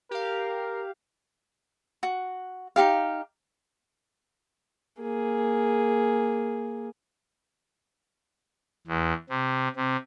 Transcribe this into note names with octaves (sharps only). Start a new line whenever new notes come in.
G4 A#4 F5
F#4
D#4 F4 G4 F5
A#3 G#4
E2
C3
C3